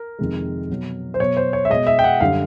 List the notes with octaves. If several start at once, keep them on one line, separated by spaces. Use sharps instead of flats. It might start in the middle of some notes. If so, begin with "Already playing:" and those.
Already playing: A#4
F2 C3 D#3 G#3
B2 F#3
C5
B2 F#3 C#5
C5
C#5
E5
B2 G#3 D#5
E5
G5
F#5
F#2 D3 G3 F5